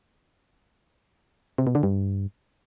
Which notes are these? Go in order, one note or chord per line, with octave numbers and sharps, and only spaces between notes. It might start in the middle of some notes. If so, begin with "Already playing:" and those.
C3
B2
D3
G2